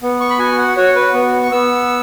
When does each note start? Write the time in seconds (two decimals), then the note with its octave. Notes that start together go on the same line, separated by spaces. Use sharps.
0.02 B3
0.20 C#6
0.30 B5
0.39 F#4 G#5
0.58 F#5
0.77 F#4 C#5
0.96 B4
1.14 B3
1.43 C#6
1.51 B3 E6